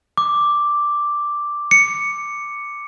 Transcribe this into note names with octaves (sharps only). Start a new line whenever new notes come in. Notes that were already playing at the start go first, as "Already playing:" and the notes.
D6
C#7